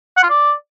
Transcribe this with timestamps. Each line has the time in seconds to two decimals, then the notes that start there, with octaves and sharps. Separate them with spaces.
0.17 F#5
0.23 F4
0.30 D5